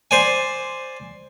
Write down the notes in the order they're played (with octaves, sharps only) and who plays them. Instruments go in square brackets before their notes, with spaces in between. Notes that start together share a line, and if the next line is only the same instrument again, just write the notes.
[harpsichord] C5 D5 G#5